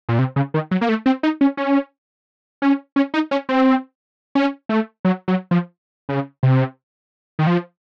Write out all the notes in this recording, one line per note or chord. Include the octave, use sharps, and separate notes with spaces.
A#2
C3
C#3
D#3
F#3
A#3
A3
C4
D#4
C#4
C#4
C#4
C#4
D#4
C#4
C4
C#4
A3
F#3
F#3
F3
C#3
C3
D#3
F3